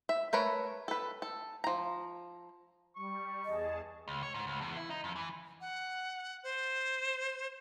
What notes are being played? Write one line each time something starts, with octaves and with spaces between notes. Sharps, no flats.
E5
A3 A#4 B4 C#5
A4 B4
A4
F3 A#5
G3 C#6
E2 G#4 D#5 A5
C#2
C#5
G#2
C#2
E2
E4
D#4
F2
E3
F#5
C5